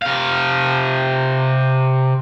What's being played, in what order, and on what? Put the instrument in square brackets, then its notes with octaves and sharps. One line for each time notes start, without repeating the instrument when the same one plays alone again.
[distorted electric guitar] C3 F5